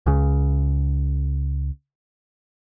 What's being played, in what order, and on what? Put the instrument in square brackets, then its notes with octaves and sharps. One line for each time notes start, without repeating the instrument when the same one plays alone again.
[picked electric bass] C#2 C#3